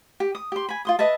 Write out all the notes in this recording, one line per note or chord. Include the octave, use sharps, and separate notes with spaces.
G4
D#6
G4 C6
G#5 B5
F4 C6 D#6
B4 D#5 E5 A5